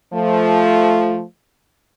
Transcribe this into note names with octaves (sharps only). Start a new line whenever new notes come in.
F3 A3